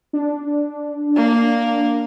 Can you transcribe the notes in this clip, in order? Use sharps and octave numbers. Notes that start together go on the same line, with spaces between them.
D4
A#3